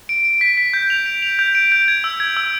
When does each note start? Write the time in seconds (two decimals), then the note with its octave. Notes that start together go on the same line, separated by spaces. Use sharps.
0.09 D7
0.25 D7
0.41 B6
0.57 B6
0.74 G6
0.90 F7
1.06 D7
1.22 F7
1.39 G6
1.55 D7
1.72 G6
1.88 G#6
2.04 E6
2.20 G#6
2.37 E6